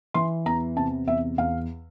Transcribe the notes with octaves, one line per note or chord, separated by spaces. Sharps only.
E3 C6
E2 A#5
C3 A5
E2 E5
E2 F5